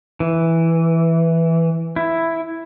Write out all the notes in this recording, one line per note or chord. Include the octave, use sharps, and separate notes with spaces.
E3
E4